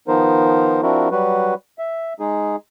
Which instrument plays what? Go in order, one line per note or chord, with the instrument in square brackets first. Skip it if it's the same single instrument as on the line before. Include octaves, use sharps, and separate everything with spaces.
[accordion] D#3 F3 B3 D#4 A#4 C5
F3 C4 D4 E4 F#4 A#4
F#3 G3 F#4 B4
E5
G#3 D#4 G#4